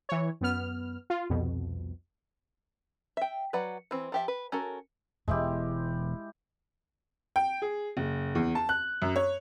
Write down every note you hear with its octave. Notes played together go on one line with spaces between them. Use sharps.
E3 C#5
F#2 B3 F6
F4
C2 F2 B2
E5 G5
F#3 B4 D5 F#5
E3 C4
F3 G4 E5
B4
C#4 F#4 A4 A#4
E1 E2 G#3 E4 G4
G5
G#4
F#1
E2
A5
F#6
F#2
C#5